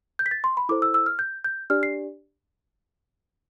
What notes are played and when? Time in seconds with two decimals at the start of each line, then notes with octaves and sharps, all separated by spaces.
0.19 G6
0.26 B6
0.31 A6
0.44 C6
0.57 B5
0.69 E4 A4 C5 D6
0.82 E6
0.94 E6
1.06 F6
1.19 G6
1.44 G6
1.70 D4 G4 D5 F6
1.83 C7